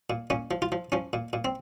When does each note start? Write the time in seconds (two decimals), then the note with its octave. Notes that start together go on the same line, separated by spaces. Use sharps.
0.10 A#2
0.30 A#2 C#4
0.51 F3
0.62 F4
0.72 F3
0.92 F3 C#4
1.13 A#2
1.33 A#2
1.45 C4